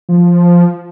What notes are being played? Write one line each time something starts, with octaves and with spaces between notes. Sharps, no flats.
F3